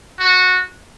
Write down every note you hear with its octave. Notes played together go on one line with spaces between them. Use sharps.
F#4